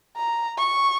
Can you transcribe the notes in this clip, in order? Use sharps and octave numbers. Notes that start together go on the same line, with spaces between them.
A#5
C#6